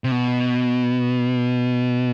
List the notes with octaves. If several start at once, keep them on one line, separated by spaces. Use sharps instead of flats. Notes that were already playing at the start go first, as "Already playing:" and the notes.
C3
B2